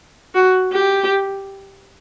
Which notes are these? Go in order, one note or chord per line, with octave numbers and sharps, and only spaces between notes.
F#4
G4